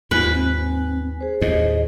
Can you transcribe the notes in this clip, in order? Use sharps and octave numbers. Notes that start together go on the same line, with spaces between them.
D#2 G#2 F4 B4 G#5
C4
G#4 C5
D#2 A2 D#5